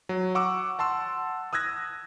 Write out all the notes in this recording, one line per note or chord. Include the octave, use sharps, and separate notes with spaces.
F#3
F#5 C#6 D6 E6
F#5 A5 C6 E6
D#6 E6 F#6 G#6 A#6